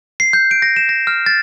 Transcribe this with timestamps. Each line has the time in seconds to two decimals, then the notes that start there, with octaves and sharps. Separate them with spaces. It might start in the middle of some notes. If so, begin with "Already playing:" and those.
0.20 C7
0.33 G6
0.51 D7
0.62 A#6
0.76 E7
0.89 A#6
1.07 F6
1.26 A6